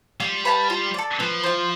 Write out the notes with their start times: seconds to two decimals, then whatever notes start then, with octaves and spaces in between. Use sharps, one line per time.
0.20 G3 F4
0.45 B4 F5 A5
0.70 F4
0.94 A4 D5
1.20 F3 B3
1.44 F4 C5